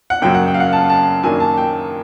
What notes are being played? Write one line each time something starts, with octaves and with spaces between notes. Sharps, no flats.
F#5
F#2 C#3 F#3 A#3 G5
F#5
G5
F5
F#5
A5
A5
F#2 D#3 F#3 A#3 D4 G#5
A5
G5